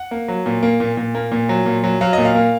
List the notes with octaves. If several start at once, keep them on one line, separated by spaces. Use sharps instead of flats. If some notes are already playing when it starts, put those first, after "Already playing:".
Already playing: F#5
A#3
F#3
A#2
A#3
A#2
A#2
A#3
A#2
F#3
A#2
F#3
F#3 F5
D#5
A#2
F5
A#3